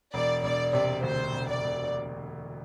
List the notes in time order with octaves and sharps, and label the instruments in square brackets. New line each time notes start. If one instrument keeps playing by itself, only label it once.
[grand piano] E1 [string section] D5
[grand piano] E1 [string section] D5
[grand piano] C3 [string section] D5
[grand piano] D2 [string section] C5
[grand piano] E1
[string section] D5
[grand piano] E1